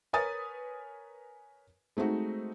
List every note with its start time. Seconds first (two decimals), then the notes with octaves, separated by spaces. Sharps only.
0.13 A#4 B4 C#5 G#5 D#6 A6
1.97 G#3 A3 C4 D#4 F#4